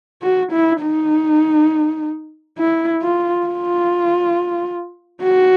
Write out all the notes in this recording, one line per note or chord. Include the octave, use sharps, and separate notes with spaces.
F#4
E4
D#4
E4
F4
F4
F#4